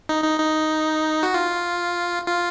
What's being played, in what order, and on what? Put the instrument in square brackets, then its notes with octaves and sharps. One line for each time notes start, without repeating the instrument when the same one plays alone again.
[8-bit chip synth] D#4
D#4
D#4
F#4
F4
F4